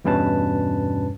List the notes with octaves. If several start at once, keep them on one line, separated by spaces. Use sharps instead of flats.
E2 G2 B2 C#4 B4 A5